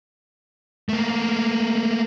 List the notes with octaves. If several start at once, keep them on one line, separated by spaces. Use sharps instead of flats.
A3 A#3